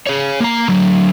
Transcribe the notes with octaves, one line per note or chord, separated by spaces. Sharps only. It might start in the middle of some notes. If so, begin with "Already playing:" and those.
G#4 C#5
A#3 A#5
D3 F#3